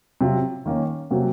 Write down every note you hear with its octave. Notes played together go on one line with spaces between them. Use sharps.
C3 F#3 C4 F4
D#3 A#3 C#4
C3 F#3 A#3 C#4 F#4